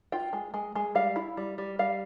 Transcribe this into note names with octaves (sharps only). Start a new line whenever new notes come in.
F4 G5
G#3
G#3
G#3
G3 F5
E4
G3
G3
G3 F5